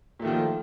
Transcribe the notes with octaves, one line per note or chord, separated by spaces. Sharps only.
A#2 D#3 F3 A3